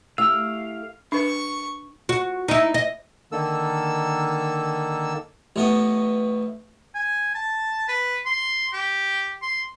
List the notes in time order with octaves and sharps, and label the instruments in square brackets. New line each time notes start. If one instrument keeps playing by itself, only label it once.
[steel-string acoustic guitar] A3 E4 G4 [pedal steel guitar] F5 [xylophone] E6
[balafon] D4 B4 [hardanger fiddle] C#6
[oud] F#4
D#4 E4
D#5
[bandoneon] D3 D#3 A#3 A4 E6
[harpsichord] A1 A2 B3 D#5
[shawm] G#5
A5
B4
C6
G4
C6